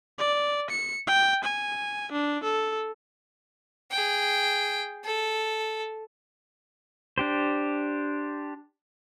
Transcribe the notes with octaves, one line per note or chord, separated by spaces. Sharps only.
D5
C#7
G5
G#5
D4
A4
G#4 G5
A4
D4 G4 C5